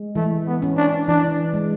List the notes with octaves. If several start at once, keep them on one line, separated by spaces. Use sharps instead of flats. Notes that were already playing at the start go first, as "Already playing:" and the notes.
Already playing: G#3
E3 A3
B3
C#4
D4
E3 D4
G#3